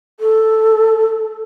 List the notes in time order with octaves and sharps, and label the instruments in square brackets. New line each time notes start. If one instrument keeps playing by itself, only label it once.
[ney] A4